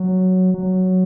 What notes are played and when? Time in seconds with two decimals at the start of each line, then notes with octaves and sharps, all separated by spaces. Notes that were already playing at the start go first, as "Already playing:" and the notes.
Already playing: F#3
0.54 F#3